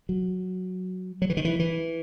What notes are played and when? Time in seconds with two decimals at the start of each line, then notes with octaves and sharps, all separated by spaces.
0.09 F#3
1.22 F#3
1.30 E3
1.37 D#3
1.45 E3
1.59 E3